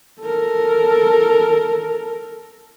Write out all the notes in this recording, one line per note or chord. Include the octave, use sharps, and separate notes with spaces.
A4 A#4